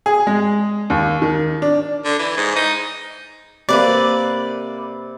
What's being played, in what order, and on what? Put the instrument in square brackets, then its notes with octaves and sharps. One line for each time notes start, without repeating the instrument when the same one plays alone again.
[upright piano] G#4
G#3
D#2
D#3
D4
[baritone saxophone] D3
E3
G#2
D#4
[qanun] C3 A#3 [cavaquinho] B4 D5